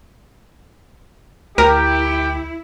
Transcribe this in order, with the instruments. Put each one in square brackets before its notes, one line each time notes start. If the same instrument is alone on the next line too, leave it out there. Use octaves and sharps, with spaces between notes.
[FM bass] D2 [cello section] E4 [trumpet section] G4 [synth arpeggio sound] A#4